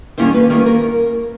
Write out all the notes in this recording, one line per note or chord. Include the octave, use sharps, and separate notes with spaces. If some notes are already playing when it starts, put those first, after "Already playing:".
D#3 G3 A#3 C#4 E4 C5
B4
D#3 G3 A#3 C#4 E4 A#4
A#4